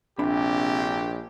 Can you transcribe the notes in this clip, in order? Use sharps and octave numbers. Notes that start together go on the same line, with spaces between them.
A#1 C3 D4 G4 B5